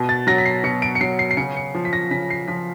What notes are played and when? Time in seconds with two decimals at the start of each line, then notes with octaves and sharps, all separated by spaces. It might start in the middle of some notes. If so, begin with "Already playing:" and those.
Already playing: B2
0.09 A6
0.27 F#3 A#6
0.38 B6
0.45 C7
0.63 B2 C#7
0.82 D7
0.95 C#7
1.01 F#3 C7
1.19 C7
1.31 C7
1.37 C#3 C#7
1.57 C#7
1.75 F3
1.85 B6
1.93 A#6
2.11 C#3 B6
2.30 C7
2.48 F3 B6